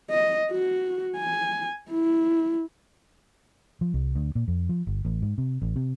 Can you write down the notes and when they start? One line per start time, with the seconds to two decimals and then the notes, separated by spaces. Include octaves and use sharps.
0.10 D#5
0.52 F#4
1.17 G#5
1.91 E4
3.81 F3
3.94 C2
4.15 D2
4.35 A#2
4.48 F2
4.69 F3
4.87 G1
5.05 A1
5.22 G#2
5.38 C3
5.62 A1
5.76 C3